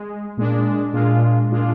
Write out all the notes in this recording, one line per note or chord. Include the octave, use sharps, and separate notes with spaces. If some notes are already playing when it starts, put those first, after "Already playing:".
Already playing: G#3
A#2 G#3 D4
A#2 G#3 D4 F4
A#2 G#3 D4 F4